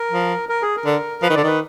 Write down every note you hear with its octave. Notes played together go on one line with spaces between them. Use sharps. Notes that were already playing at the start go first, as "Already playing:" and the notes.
Already playing: A#4
F3
A#4
G#4
A#4
D3
F3 B4
D#3
D3 D5
D#3 B4